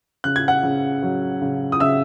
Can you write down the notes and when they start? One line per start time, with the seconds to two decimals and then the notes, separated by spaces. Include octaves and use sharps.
0.24 C#3 F#6
0.36 G#6
0.48 F#5 F#6
0.63 C#3
1.02 F#3
1.42 C#3
1.72 D#6
1.80 C#3 E5 E6